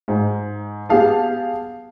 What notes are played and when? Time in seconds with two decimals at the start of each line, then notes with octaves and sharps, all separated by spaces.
0.08 G#2
0.89 B3 G4 G#4 F5 A5